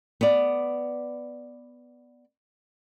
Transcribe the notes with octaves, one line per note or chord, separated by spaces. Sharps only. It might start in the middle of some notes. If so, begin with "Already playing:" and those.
B3 D5